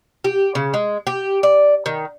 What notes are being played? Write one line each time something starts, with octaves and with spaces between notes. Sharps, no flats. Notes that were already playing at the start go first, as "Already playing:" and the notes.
G4
C#3
G#3
G4
D5
D#3